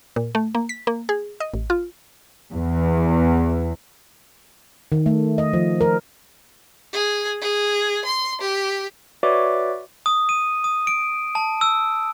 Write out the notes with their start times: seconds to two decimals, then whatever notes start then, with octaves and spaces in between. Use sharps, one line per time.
0.16 A#2
0.35 A3
0.55 A#3
0.69 B6
0.87 A#3
1.09 G#4
1.40 D#5
1.54 A1
1.70 F4
2.51 E2
4.92 D#3
5.06 A3
5.38 D#5
5.53 F3
5.81 A#4
6.92 G#4
7.40 G#4
8.04 C6
8.40 G4
9.23 F#4 B4 C#5 D5 E5 D6
10.06 D#6
10.29 D#7
10.64 D#6
10.87 D7
11.35 A5
11.61 E6